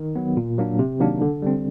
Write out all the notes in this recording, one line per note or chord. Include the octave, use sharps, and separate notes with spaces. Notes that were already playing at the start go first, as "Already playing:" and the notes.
Already playing: D#3
F#3 B3
A#2
F#3 A#3 D4
C3
D#3 F#3 A#3 D4
D3
G3 C4